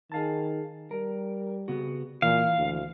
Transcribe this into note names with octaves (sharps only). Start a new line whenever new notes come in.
D#3 G#4 F5 A5
G3 A#4
C#3 B3 F#4
A#2 E3 F5
D2